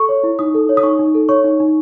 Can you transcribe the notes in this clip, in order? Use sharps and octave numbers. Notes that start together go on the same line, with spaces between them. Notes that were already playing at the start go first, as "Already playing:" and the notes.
Already playing: A4 C#6
C#5
E4
D#4 D#6
A4
C#5
D#6
D#4 C#6
D#4
A4
C#5 C#6
D#4
D#4